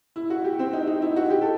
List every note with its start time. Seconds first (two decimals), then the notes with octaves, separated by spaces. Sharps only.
0.16 E4
0.30 F#4
0.44 G4
0.59 C4
0.73 D#4
0.87 D#4
1.02 E4
1.16 F#4
1.30 G4
1.41 A4